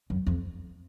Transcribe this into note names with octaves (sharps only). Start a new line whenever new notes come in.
F#2
F2